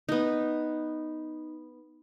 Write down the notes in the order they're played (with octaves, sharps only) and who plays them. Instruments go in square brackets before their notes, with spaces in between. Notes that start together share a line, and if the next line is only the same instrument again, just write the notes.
[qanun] B3 D#4